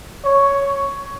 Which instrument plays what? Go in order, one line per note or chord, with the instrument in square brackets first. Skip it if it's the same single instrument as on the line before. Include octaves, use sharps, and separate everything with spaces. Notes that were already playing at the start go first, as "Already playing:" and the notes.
[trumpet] C#5